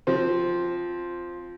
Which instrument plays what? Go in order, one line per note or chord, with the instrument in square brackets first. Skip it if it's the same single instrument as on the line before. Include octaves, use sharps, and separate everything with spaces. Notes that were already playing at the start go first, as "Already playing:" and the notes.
[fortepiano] F3 C4